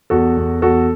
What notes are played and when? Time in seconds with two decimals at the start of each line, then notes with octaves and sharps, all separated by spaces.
0.10 E2 F#4 A4
0.37 E2
0.62 E2 F#4 A4